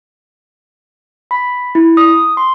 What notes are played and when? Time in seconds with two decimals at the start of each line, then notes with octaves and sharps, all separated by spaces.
1.31 B5
1.75 E4
1.97 D#6
2.37 C6